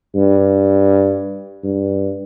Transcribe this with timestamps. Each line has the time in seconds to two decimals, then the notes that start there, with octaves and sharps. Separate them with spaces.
0.15 G2
1.64 G2